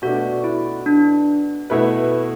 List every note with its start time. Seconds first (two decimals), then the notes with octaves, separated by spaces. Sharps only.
0.02 B2 A3 D4 F#4
0.44 E4
0.86 D4
1.70 B2 A3 E4 B4